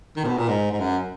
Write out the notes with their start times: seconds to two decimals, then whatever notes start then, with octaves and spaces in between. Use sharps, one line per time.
0.16 D#3
0.24 A#2
0.27 B2
0.37 A#2
0.48 G#2
0.72 G#2
0.80 F#2